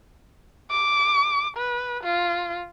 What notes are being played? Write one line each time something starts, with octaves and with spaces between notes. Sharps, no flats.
D6
B4
F4